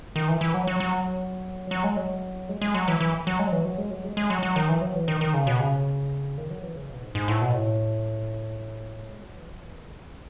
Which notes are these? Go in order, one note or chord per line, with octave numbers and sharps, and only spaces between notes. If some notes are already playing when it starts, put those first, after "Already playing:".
D#3
E3
E3
F#3
F#3
F#3
F#3
G#3
F#3
G#3
G#3
F#3
E3
E3
F#3
G#3
F#3
E3
F#3
G#3
F#3
G#3
G#3
F#3
F#3
D#3
E3
F#3
E3
D#3
D#3
C#3
B2
C#3
D#3
F#3
E3
C#3
B2
G#2
G#2
A2
B2
A2
G#3
F#3
E3
F#3
E3
D#3
C#3